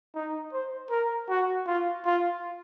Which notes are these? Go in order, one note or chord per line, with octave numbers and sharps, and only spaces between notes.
D#4
C5
A#4
F#4
F4
F4